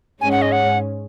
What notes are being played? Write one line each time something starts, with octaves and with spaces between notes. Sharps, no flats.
G#2 G#3 C#4 G#5
F#5
D#5
F#5